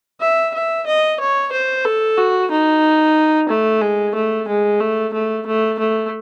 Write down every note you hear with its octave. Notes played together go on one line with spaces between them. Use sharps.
E5
E5
D#5
C#5
C5
A4
F#4
D#4
A3
G#3
A3
G#3
A3
A3
A3
A3